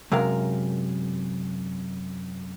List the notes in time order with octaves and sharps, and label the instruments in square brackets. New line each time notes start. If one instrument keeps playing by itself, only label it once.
[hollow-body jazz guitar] F#2 C3 G#3 A#4 F5